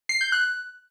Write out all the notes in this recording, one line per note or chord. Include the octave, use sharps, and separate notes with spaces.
C7
G6
F#6